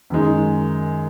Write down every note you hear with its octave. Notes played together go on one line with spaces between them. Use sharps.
F#2 D#3 G#3 D#4